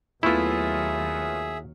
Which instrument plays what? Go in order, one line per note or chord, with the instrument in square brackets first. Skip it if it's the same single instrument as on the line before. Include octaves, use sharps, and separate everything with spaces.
[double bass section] D#2 F#3 [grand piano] A3 B3 F4 [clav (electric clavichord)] E4 [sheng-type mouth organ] G#4 E5